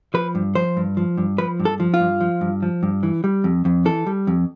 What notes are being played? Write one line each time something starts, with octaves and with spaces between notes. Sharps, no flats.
F3 B4
G2
F3 C5
G2
F3
G2
F3 B4
G2
A4
F3
F4
G2
F3
G2
F3
G2
E3
G3
F2
F2
E3 A4
G3
F2